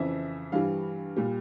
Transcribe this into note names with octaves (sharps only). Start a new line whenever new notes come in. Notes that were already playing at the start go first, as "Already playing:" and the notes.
Already playing: F2 C#3 E3 E5
G2 E3 G3 F5
A#2 G3